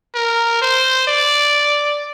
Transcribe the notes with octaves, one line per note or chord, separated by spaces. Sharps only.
A#4
C5
D5